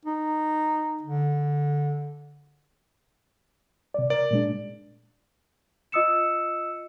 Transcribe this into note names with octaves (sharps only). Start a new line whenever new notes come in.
D#4
D3
C3 D5
A#4 D5
A#2 G#3 D4
F4 D#5 D#6 E6 C#7 E7